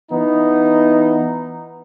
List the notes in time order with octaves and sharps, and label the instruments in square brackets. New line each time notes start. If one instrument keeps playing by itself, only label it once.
[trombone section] E3 B3 D#4